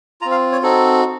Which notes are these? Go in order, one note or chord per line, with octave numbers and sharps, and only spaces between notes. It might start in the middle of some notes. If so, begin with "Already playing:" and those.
C4 F4 A#5
F5
C#5
C4 D#4 F#4 A4